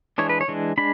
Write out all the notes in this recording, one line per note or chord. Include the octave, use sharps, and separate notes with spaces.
E3 G#3 D4 C#5
B4
C#5
E3 G#3 D4
G#3 D4 B5